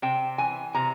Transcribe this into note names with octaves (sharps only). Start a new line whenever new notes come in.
C3 G5
E3 G#5
C3 A#5